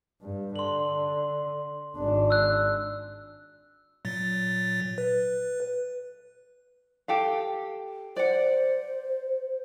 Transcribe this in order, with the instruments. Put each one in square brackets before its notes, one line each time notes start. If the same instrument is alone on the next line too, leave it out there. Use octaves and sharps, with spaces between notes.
[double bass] G2
[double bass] D3 [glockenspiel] C6 F#7
[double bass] G#1 D4
[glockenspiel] E6 F#6
[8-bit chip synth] A#2 F#3 A6
B4
[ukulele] G4 A4 F5
[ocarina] C5 [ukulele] D5 F#5